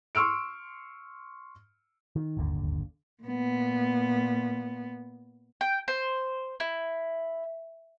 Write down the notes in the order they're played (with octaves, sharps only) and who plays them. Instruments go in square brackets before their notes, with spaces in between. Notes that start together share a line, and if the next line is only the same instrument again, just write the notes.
[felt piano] C6 C#6 E6 F6 D7
[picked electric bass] D#3
D1 G1 D#2 D3
[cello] A#2 B3
[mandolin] G5
C5
E4